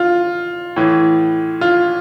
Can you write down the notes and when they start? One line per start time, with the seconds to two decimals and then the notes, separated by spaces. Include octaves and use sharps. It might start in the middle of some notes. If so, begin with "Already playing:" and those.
Already playing: F4
0.76 A2 E3
1.61 F4